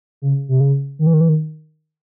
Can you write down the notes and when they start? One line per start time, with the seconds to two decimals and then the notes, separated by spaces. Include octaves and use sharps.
0.22 C#3
0.49 C3
0.60 C#3
0.99 D#3
1.07 E3
1.14 D#3
1.21 E3
1.29 D#3